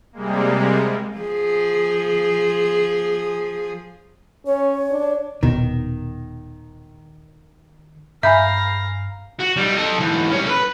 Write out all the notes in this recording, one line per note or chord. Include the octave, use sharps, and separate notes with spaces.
C3 G3 G#3 A#3
F3 G#4
C#4 C#5
D4
D#1 B2 D#3
G2 E5 F5 G#5 A#5 B5 G6
F#4
G3 D#4
A4 D#5
G#2 E3
G3 C#4
A4 B4